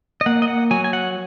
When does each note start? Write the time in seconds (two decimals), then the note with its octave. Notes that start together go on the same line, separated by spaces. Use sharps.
0.21 D#5
0.26 A#3 F#5
0.42 D#5
0.48 F#5
0.71 F#3 G#5
0.84 G#5
0.93 F#5